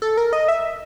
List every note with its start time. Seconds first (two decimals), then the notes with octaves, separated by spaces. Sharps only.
0.02 A4
0.17 A#4
0.33 D#5
0.48 E5